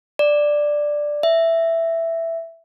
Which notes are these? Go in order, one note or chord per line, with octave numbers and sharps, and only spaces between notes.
D5
E5